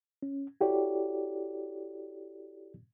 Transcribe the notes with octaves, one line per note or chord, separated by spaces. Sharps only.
C#4
E4 F#4 G4 A4 C#5 D5